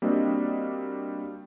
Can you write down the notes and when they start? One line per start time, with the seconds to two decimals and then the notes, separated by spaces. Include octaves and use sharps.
0.02 G3 A#3 C4 D4 F#4 D#5